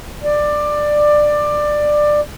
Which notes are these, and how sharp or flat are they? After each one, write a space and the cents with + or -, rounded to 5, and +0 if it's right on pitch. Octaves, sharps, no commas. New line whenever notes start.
D5 +15